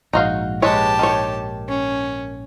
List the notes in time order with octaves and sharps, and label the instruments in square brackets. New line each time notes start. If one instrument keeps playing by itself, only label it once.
[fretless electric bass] A#1 G#2 [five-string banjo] D#4 F#4 F5
[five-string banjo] G#3 B4 C#5 [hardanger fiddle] G4 A5
[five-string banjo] D#3 C#5
[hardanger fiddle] C#4